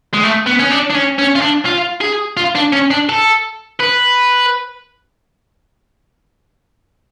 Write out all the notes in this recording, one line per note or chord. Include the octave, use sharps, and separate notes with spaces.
G#3
A3
B3
C#4
D4
D4
C#4
C#4
F4
D4
F4
G#4
F4
D4
C#4
D4
A4
B4